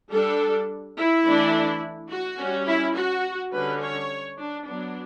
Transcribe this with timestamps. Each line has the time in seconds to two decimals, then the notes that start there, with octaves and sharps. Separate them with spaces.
0.11 G3 D4 A4
0.97 E4
1.25 E3 A3 D4
2.10 F#4
2.38 G3 C#4
2.67 E4
2.95 F#4
3.51 D3 G3 C#4 B4
3.80 C#5
4.38 D4
4.65 F#3 B3 D4